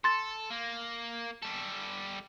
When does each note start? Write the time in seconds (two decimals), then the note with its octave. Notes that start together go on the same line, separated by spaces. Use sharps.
0.04 A4 C6 A6
0.51 A#3
1.43 G3 A4